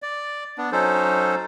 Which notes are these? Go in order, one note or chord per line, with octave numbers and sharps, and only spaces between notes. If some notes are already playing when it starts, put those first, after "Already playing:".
D5
B3 D4
F#3 C#4 D#4 A4 C5